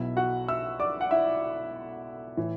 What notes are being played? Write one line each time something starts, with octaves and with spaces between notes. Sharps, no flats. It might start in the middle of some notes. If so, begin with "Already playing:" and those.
Already playing: B1 B2 E4 E5
F#4 F#5
E5 E6
D5 D6
F#5
E4 E5
A2 E3